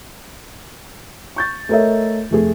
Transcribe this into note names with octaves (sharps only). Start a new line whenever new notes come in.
C#6 G6 A6
A3 A4 A#4 C#5 D#5 E5
F1 A3 G#4